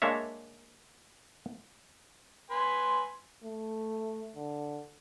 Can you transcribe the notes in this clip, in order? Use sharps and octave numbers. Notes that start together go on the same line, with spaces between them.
G#3 A#3 D4 C#5 E5
B4 G#5 C6
A3
D3